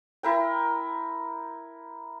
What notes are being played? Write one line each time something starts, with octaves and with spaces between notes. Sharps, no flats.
E4 A#4 G5